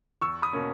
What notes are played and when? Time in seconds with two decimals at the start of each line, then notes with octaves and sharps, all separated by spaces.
0.21 E2 C#6 E6
0.42 B5 D#6
0.53 B2 A#3 C#4